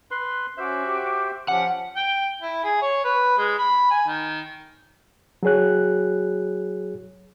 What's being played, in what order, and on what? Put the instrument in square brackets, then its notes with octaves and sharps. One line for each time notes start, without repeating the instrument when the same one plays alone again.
[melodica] B4 C6
[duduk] C#4 [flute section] F#4 D6 [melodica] C5 E5
[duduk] G4
[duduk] F3 [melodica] C#4 [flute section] G4 [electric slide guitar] F#5
[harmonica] G5
E4
G#4
C#5
B4
G#3
B5
G#5
D#3
[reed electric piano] F#3 F#4 G#4 C#5 F#6